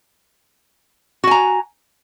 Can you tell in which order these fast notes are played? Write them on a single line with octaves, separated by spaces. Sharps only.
F#4 G#5 A#5